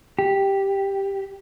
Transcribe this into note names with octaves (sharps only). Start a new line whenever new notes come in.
G4